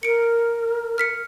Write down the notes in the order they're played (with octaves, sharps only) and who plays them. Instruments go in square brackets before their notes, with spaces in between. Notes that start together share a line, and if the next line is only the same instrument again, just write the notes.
[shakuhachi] A#4 [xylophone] C#7 D7
[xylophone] F6 B6 C#7